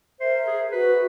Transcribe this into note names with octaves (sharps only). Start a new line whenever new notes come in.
A#4 C5 E5
G#4
F#4 B4